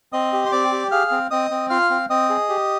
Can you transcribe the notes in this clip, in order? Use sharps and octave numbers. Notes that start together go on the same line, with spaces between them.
C4 D#5 D#6
G4
C6
C4 D5 D6
G4
G#4 F5 F6
C4
C4 D#5 D#6
C4
F4 F5 F6
C4
C4 D#5 D#6
G#4
G4